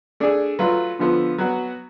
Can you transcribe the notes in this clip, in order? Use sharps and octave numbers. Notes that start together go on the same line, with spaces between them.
A3 D4 G#4
F#3 A3 F4 B4
D3 F3 B3 F4 A4
F#3 B3 F#4